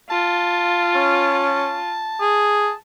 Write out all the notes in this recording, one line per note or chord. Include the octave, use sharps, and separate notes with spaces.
F4 A5
C#4
G#4